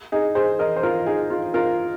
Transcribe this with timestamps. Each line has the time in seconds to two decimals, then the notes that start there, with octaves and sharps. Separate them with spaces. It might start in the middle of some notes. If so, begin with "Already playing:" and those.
0.12 D#4 G#4
0.35 G#4 C5
0.59 A#4 D#5
0.76 C5
0.83 F4 A#4
1.06 D#4 G#4
1.30 F4
1.54 F4 A#4